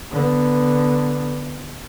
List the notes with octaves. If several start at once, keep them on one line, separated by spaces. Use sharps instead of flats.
D3 B3